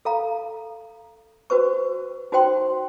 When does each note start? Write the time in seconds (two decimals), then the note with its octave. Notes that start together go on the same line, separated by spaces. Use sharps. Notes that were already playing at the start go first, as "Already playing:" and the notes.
0.05 A4 F5 A#5
1.50 F#4 B4 C5 C#6
2.32 D#4 F#4 C5 G5 C6